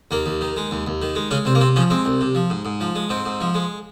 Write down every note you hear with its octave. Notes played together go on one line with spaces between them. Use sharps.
D#2 A#3
D#2
D#3
G#3
D#2
D#2
D#3
G#3
C#3 G#3 C#4
C2 C4
A#3
C3 C4
C#3 F3 C#4
G#3 C4
C2
C3
F3
G#2
G#2
F3
G#3
G#2 C4
G#2
F3
G#3